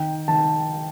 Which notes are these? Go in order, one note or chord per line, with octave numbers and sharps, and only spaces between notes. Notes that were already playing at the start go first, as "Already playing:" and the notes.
Already playing: D#3 G5
D#3 A5